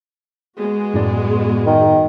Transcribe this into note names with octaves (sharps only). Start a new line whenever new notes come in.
G#3 B3 F#4
F#2 A2 D5
D#3